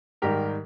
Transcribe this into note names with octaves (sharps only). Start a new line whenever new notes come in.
G#2 D#3 G3 G4 A#4